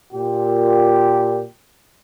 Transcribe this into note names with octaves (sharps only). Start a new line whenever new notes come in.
A#2 G4